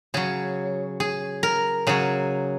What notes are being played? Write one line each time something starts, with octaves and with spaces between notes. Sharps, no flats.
C#3 F#3 G#4
G#4
A#4
C#3 F#3 G#4